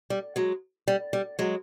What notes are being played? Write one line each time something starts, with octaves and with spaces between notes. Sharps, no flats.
G3
F#3 G#3
G3
G3
F#3 G#3